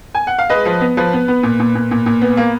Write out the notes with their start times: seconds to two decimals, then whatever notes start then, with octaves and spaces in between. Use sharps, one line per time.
0.15 G#5
0.27 F#5
0.38 F5
0.50 G#3 B4 D#5
0.65 F3
0.81 B3
0.97 F3 B4
1.13 B3
1.28 B3
1.43 A#2
1.60 A#2
1.75 A#2
1.91 A#2
2.06 A#2
2.22 B3
2.37 A#3